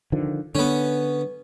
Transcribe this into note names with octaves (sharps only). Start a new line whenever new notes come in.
D3 D#3 F3
D3 B3 C#4